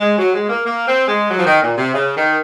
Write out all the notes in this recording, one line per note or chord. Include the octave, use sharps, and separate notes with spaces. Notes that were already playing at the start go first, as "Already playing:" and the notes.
G#3
F#3
G#3
A#3
A#3
C4
G#3
F#3
F3
D#3
A#2
C3
C#3
D#3